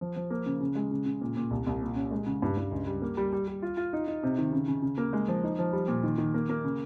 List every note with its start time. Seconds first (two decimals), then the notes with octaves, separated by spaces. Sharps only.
0.01 F3
0.16 F3
0.30 A#3
0.46 C#3
0.61 C#3
0.75 G#3
0.91 C#3
1.06 C#3
1.21 A#2
1.36 A#2
1.51 C2
1.67 C2
1.82 A#2
1.96 C#4
2.11 G#3
2.26 C#3
2.42 G2
2.57 G2
2.71 C#2
2.87 G3
3.02 A#3
3.17 G3
3.33 G3
3.48 G3
3.62 F4
3.77 F4
3.93 D#4
4.07 D#4
4.23 C3
4.38 D#3
4.52 C#3
4.68 C#3
4.82 C#3
4.98 A#3
5.13 G#3
5.28 F3
5.44 D#4
5.59 F3
5.73 G3
5.88 A#2
6.03 D#3
6.18 D#3
6.34 A#3
6.49 A#3
6.64 C#3